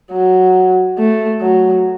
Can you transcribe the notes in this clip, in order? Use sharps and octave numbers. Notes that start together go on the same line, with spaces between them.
F#3
A3
F#3